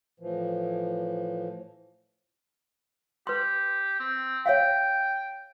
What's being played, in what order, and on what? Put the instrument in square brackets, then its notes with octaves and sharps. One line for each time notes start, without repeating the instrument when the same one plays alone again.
[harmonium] A2 E3 F3
[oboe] G4 [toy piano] B4 C6
[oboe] C4
[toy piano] C#5 E5 F5 [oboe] G5